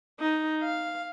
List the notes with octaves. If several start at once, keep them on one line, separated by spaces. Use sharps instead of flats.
D#4
F5